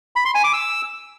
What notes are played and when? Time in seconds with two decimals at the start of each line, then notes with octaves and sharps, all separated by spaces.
0.16 B5
0.25 C6
0.35 G#5
0.44 D6
0.53 E6